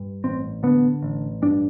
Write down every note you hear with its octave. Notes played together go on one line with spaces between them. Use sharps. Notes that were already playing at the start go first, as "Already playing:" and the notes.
Already playing: G2
A1 C4
D3 B3
A1
G2 D4